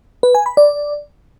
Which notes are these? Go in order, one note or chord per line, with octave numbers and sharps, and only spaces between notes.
B4
G#5
B5
D5